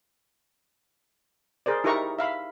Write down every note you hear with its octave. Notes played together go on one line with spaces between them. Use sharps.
G#4 A#4 C5 D5
D#4 E4 G4 A#4 A#5 C#6
E5 F5 B5